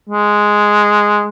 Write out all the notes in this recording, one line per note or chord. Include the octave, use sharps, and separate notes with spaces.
G#3